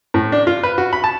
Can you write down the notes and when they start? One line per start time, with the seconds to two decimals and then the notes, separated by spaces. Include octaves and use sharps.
0.14 A2
0.32 D4
0.47 F4
0.63 B4
0.78 F#4
0.93 B5
1.04 A5